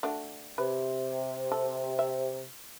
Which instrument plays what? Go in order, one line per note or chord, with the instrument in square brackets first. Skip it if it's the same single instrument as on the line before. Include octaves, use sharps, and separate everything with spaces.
[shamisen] A3 D4 F#4
[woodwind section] C3 [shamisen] B4
[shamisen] A4
E5